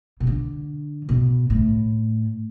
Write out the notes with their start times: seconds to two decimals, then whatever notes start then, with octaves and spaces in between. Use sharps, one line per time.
0.20 B2
0.27 D3
1.09 B2
1.50 A2